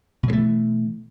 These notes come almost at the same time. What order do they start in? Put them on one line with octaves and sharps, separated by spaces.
B2 F#3 A3 E3